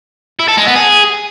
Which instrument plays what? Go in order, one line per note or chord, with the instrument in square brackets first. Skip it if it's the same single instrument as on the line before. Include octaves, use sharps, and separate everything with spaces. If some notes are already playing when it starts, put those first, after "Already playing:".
[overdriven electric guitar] E4
A4
G#3
B3
G#4